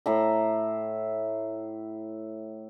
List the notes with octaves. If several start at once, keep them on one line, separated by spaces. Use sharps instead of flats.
A2 E5 A#5